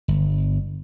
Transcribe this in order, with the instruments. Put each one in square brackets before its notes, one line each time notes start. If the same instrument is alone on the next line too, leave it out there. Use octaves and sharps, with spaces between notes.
[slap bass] G1